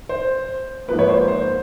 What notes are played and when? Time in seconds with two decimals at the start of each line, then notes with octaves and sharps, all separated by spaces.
0.09 C5
0.88 G#2 F3 A#3 B4
0.99 B4 C#5
1.09 C5
1.28 C5